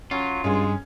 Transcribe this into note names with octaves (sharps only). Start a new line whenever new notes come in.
F#3 C#4 F4
G2 G#3 C#4 G#4